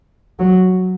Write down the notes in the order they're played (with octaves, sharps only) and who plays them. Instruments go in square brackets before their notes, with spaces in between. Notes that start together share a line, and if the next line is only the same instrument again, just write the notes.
[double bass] F#3